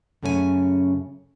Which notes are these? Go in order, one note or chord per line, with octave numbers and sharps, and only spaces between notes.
F#2 C#3 A3 C#4 A4 G#5